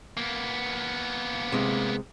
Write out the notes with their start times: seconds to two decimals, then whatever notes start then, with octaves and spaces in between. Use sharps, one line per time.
0.17 A#3 B3
1.52 C3 G#3